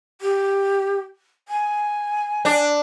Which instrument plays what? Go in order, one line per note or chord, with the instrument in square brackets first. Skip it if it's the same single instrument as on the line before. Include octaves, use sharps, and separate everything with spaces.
[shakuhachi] G4
G#5
[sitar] D4